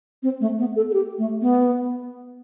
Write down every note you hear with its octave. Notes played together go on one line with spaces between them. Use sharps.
C4
A3
B3
A4
A4
G4
A3
B3